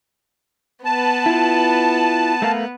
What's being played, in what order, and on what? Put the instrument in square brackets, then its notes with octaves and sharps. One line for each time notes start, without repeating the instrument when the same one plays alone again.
[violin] B3 B4 [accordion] A5
[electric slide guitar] E4 F4
A3 A#4 F5